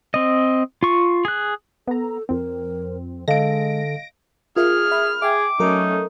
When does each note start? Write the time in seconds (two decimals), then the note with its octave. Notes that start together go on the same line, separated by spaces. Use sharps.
0.14 C4 D#5
0.83 F4 C#6
1.25 G#4 F#6
1.87 B3 A4 A#5
2.29 F2 C4 A#4
3.28 D3 G#3 A4 D#5 F5 A#6 D7
4.57 F4 G#4 A#4 E5 F6
4.91 E5 B5
5.22 G#4 E5 G5 D6
5.60 F#3 A3 C#4 D#4 A4 A#4